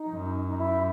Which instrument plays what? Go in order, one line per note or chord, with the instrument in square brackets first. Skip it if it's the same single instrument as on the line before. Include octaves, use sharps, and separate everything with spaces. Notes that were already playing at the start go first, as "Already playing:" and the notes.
Already playing: [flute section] D#4
[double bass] F#2
[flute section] D#4
E4